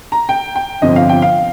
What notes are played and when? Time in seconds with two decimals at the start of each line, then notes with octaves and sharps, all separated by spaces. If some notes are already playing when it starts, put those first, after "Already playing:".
0.12 A#5
0.29 G5
0.56 G5
0.82 G1 F2 C3 F3 C4 D#5
0.96 F5
1.09 G5
1.22 F5